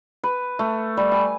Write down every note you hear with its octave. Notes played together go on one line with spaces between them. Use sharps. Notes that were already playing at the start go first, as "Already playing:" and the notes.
B4
A3
G3
G#5